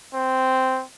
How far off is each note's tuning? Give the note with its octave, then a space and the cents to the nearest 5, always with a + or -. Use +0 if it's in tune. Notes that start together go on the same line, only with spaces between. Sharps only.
C4 -5